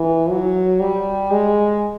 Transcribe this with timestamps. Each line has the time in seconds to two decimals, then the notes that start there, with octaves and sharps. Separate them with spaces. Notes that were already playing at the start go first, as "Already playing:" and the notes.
Already playing: E3
0.30 F#3
0.80 G3
1.31 G#3